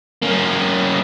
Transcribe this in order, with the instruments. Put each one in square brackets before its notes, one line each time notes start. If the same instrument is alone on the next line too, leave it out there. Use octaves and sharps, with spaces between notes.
[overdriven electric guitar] A#3 C#4